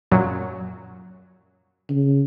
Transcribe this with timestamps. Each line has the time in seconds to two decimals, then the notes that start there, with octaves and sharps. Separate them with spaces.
0.12 F#2 A#2 F#3
1.90 C#3